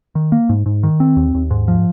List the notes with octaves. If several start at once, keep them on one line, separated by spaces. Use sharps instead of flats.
D#3
A#3
G#2
G#2
D#3
C4
D#2
D#2
G#2
F3